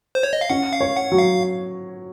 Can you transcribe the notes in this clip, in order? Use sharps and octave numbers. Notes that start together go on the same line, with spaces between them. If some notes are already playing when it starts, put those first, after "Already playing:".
C5
C#5
D#5
F5
C#4 F#5
F5
C#5
F#5
F#3
F5